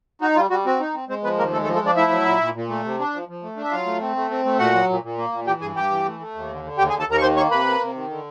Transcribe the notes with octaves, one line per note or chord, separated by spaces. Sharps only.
D#4 F#4
G3 F4
G3 F#4
C4 F#4
D#4
C4
G#3 C4 C5
F3 B3 B4
D#2 A#3 A#4
G#3 A3 A4
A3 A4
F3
A3 A4
F3 D4 D5
A3 E4 E5
F#3
A#2
A#2
A#2
A3
C3
D4
F3
F3
A3
D4
E5
F#3 F4 F5
A3
C4
A3
C4
A3
A#2 F#4 F#5
F#3
A#2
A#2
A#3
A#2
E3 G4 G5
G2 G#4 G#5
G2 G4 G5
E3
A3
A3
D#2
D3
D3
D#2 G4 G5
G#4 G#5
D#2
A4 A5
D#2 A#4 A#5
C#6
D#3 C5 C6
A#3 C#5 C#6
C3 B4 B5
A#3
C3
D#3
D3